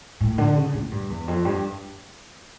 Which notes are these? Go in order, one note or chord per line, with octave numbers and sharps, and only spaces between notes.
A2
D3
C#3
A2
G2
E2
F2
G2